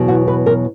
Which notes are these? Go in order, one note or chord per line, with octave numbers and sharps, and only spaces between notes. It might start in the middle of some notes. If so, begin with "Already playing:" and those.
Already playing: E2 B2 F#3
F#4
B4
A#4